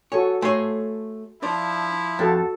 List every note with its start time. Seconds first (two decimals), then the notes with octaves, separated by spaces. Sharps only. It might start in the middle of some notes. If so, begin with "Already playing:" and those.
0.12 F#4 A4 C#5 G#5
0.42 A3 C#5 G#5 C6
1.43 F3 D4 E4
2.19 F2 F#4 A4 A5